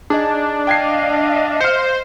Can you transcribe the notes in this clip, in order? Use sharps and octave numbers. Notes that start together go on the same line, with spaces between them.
D4 D#4 G#4
D#5 F5 G5 G#6 C7
C5 F6 C#7